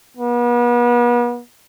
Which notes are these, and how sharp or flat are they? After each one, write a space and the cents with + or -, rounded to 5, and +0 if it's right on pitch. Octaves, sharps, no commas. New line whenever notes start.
B3 -40